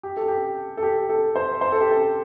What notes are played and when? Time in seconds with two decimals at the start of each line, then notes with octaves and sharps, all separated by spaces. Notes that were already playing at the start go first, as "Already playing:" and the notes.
0.03 G4
0.17 A4
0.28 G4
0.77 A4
0.83 G4
1.09 A4
1.36 C5
1.61 C5
1.72 A4
1.81 G4
1.91 A4